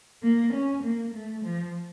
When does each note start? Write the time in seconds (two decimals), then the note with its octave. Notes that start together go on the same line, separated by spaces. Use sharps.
0.23 A#3
0.53 C#4
0.84 A#3
1.15 A3
1.45 F3